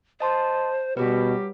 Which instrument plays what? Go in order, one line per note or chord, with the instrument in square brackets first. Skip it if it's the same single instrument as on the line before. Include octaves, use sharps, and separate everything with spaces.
[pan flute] C5 [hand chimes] D#5 A5 C6
[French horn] B2 [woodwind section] F#3 G3 G4 [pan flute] F#4 [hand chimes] B4